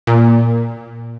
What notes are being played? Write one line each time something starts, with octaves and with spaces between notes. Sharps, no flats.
A#2